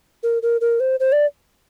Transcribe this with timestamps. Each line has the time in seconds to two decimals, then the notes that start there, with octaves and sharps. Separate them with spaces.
0.23 A#4
0.43 A#4
0.61 A#4
0.80 C5
1.00 C5
1.12 D5